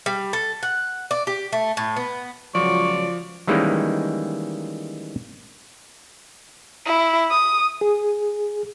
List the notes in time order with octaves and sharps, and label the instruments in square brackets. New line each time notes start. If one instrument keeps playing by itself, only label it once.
[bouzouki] G3
A4
F#5
D5
G4
A3
A2
B3
[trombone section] C#2 F#3 [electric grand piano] F3 [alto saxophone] D5 [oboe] C#6
[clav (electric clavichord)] D#3 E3 G3 G#3 A#3 C#4
[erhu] E4
D#6
[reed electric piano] G#4